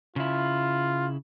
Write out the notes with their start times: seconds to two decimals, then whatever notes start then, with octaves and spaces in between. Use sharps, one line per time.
0.16 C#3 E4 F4